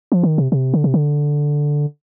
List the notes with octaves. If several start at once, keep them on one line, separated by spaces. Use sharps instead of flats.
F3
D#3
C3
C3
D3
C3
D3